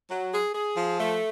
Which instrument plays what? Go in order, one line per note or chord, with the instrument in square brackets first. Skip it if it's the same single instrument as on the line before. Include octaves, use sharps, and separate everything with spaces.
[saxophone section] F#3
G#4
G#4
F3
A3